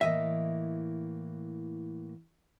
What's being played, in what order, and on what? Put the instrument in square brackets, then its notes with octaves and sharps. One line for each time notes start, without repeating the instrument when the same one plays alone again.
[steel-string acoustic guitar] A2 E3 A#3 [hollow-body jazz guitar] D#5 E5